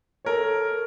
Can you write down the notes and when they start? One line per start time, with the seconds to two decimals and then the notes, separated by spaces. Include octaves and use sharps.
0.25 A4 A#4 C#5